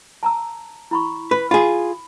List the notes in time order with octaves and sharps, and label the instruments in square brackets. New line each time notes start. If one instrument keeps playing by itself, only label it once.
[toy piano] A5 A#5 E6
E4 B5 C#6
[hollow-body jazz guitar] B4 [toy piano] B5
[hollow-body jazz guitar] F4 G#4 [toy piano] B5